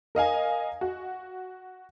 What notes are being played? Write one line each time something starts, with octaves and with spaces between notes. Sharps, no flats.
A#4 D#5 F5 G#5
F#4